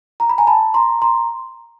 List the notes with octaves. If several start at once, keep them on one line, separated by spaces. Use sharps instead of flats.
A#5
B5
G#5 A#5
A5 B5
A#5 C6
A#5 C6